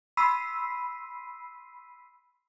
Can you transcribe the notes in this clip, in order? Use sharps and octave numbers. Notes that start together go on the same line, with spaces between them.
B5 C6 E6 B6 C7 D#7